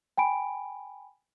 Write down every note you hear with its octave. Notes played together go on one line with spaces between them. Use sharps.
G5 G#5 B5 D7